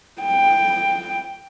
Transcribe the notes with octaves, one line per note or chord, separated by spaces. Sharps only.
G5